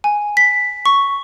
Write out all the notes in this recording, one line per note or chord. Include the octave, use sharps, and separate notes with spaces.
G#5
B6
C#6